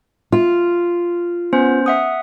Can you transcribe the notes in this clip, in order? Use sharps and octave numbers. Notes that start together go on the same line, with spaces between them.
F4
B3 C#4 C5
E5 F#5 D#6